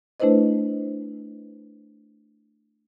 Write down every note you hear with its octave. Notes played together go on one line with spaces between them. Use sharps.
A3 D4 E4 B4 C5 D#5